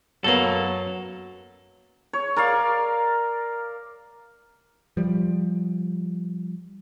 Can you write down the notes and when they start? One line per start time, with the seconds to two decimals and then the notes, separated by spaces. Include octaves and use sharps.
0.24 F#2 F#3 A#3 B3 A4
2.13 C#5
2.37 A#4 D5 F5
4.97 F3 G3